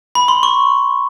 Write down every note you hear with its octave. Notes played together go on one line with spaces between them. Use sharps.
B5
C6
C#6